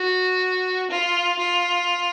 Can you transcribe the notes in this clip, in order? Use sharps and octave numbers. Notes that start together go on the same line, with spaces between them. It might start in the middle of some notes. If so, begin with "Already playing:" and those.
Already playing: F#4
F4
F4